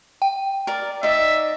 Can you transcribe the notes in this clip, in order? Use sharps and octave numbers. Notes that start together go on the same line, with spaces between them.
G5
A#4 D5
D#4 D5 E5